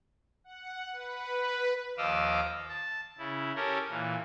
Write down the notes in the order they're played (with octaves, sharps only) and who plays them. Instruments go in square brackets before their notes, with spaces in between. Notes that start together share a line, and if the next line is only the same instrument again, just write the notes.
[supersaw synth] F#5
B4
[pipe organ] D#2 F3 D#5 F5 D6 E6
A5
C#3 E4
C#4 G4 A4 A#4 C#5
A#2 E3